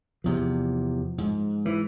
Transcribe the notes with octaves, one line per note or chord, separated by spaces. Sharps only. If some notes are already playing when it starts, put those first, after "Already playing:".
E2 C3 F3
G#2
E3